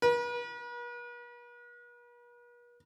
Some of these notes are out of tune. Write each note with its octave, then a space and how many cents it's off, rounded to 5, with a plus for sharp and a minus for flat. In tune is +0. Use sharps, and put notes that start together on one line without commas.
B4 -45